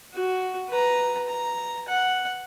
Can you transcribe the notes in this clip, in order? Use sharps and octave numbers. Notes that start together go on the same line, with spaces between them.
F#4
B4 A#5
A#5
F#5